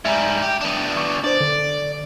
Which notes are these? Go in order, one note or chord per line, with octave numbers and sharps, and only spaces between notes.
G#2 G3 E5 G#5 A#5
G4 E5
B3 D4
C#6 D6
D4 C5 D5
D3